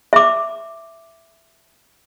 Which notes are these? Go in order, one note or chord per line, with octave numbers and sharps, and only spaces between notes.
E5 D6